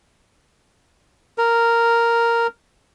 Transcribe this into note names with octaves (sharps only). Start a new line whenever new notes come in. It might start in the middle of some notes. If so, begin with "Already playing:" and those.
A#4